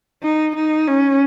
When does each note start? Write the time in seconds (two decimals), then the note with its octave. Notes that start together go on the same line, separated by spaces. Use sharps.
0.22 D#4
0.56 D#4
0.88 C#4